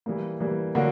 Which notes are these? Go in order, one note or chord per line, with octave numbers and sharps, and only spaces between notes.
E3 G3 A#3
E3 G3 A#3
D3 F#3 A#3 D4 F#4